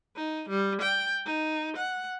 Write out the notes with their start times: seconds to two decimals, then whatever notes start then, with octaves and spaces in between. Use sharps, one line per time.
0.16 D#4
0.49 G3
0.81 G5
1.26 D#4
1.76 F#5